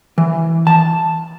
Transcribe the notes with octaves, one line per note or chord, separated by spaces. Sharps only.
E3
A5